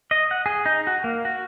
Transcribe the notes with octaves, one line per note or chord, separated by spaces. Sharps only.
D#5
F#5
G#4
D#4
F#4
A#3
F#4